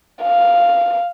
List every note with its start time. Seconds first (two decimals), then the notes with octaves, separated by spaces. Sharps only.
0.23 F5